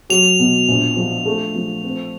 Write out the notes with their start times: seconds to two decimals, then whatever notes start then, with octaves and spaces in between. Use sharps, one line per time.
0.10 F#3 F7
0.39 B2
0.68 A#1
0.96 F3
1.26 A3
1.55 F3
1.84 C4